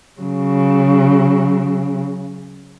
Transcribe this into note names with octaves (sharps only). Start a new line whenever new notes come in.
C#3 F#3